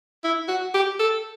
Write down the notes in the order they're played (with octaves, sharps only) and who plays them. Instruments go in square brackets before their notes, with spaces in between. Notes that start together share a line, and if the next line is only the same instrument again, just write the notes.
[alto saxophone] E4
F#4
G4
A4